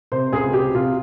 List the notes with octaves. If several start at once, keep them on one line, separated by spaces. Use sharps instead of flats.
C3 C5
C#2 G#4
C3 G4
C3 F4